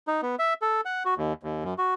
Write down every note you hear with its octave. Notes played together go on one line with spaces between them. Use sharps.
D#4
B3
E5
A4
F#5
F#4
D#2
D#2
F#2
F#4